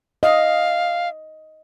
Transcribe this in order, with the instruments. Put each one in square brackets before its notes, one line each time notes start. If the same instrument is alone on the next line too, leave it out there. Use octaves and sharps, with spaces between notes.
[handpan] D#5 [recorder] F5